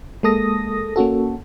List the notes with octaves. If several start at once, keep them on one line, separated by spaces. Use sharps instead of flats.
G#3 A#3 A4 D#6 A#6
A#3 C#4 F#4 A4